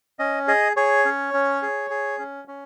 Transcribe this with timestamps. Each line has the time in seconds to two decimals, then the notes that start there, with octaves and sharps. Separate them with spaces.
0.19 C#4 D#5
0.48 G#4 D#5
0.76 G#4 C#5
1.05 C#4
1.34 C#4
1.62 G#4
1.90 G#4
2.19 C#4
2.48 C#4